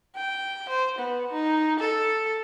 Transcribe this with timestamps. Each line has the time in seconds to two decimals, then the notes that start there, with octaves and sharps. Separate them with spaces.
0.16 G5
0.69 C5
0.98 B3
1.32 D#4
1.79 A4